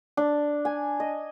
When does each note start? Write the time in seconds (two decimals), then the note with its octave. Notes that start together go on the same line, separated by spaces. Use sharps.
0.17 D4
0.65 G#5
1.00 D#5